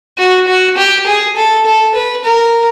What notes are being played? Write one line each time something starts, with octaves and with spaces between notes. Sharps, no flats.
F#4
F#4
G4
G#4
A4
A4
B4
A#4